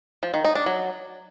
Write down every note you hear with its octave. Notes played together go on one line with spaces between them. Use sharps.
F3
D#3
D#4
D4
F#3